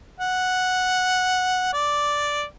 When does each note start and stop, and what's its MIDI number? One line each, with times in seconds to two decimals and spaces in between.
0.20 1.72 78
1.74 2.43 74